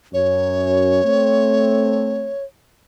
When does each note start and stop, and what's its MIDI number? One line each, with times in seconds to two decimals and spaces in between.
0.14 1.00 42
0.14 1.00 61
0.14 2.44 73
1.04 2.31 57
1.04 2.31 60